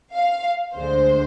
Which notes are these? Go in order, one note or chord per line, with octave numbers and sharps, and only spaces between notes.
F5
D2 D3 G#3 C5